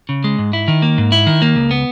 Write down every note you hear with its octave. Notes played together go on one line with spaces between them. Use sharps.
C#3
G#3
G#2
E4
D#3
A#3
G#2
E4
D#3
A#3
C#2
B3